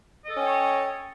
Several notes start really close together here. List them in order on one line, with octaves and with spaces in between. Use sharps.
D#5 A4 C#4 G5 C#5